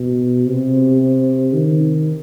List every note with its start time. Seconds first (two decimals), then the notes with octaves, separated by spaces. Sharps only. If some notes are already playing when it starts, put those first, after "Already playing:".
Already playing: B2
0.46 C3
1.53 D#3